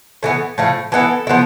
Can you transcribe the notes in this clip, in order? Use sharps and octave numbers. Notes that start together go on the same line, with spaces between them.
A2 E3 B3
A2 F3 A3
E3 B3 E4 A4
F3 B3 E4